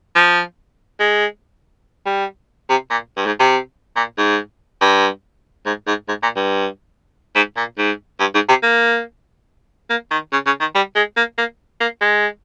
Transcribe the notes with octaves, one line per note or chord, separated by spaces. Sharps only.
F3
G#3
G3
C3
A#2
G2
G#2
C3
A#2
G#2
G2
G#2
G#2
G#2
A#2
G2
G#2
A#2
G#2
G2
G#2
C3
A#3
A#3
D#3
C#3
C#3
D#3
G3
G#3
A#3
A#3
A#3
G#3